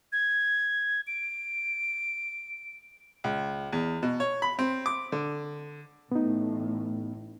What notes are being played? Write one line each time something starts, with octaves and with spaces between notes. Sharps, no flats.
G#6
D7
C#2
E2
B2
C#5
B5
C4
D6
D3
A1 A2 B3 D#4